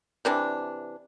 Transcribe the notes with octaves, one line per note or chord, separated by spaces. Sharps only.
C3 E3 D4